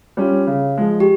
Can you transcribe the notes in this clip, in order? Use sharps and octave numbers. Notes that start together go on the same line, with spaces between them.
G3 C#4 F4
C#3
F3 G#3
G4